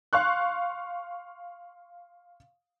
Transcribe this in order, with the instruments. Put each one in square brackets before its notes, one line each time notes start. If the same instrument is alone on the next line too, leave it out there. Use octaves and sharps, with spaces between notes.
[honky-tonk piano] F5 C6 C#6 F#6